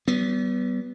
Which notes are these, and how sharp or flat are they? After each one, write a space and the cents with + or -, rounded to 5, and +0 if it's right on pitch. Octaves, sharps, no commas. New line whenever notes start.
G3 -40 B3 +0